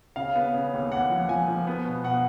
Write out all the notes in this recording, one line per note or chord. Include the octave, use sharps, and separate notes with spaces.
C#3 F5
B3
C#3
D#2
D#2 F#5
F3
F3 G#5
F3
B3
B2
B2 F#5